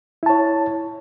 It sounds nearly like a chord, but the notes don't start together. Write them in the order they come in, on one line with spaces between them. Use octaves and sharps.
E4 A5 C#5